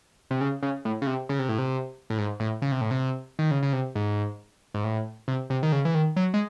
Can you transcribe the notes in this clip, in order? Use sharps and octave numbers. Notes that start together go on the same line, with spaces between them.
C3
C#3
C#3
A2
C#3
C3
C#3
C3
A2
C3
A2
G#2
A2
C#3
C3
A2
C3
D#3
C#3
C#3
C3
G#2
G#2
A2
C3
C3
D#3
C#3
E3
D#3
F#3
G#3